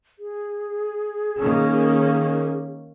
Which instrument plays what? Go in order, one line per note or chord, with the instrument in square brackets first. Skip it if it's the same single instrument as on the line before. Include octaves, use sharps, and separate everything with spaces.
[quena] G#4
[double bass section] D#3 A#3 C#4